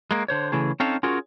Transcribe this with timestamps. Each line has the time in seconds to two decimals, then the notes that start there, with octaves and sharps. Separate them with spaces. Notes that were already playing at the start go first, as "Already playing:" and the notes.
0.11 G#3 A#3
0.28 D3 C5 C#5
0.52 C#3 E3 A3 G#4
0.80 C4 C#4 D#4 A4 F5
1.03 C#4 F4 F#4 G#4 A#4